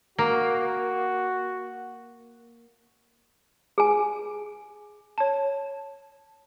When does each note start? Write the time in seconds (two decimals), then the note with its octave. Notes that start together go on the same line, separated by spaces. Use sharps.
0.18 A#3 F#4
3.78 G#4 G#5
5.18 C#5 A5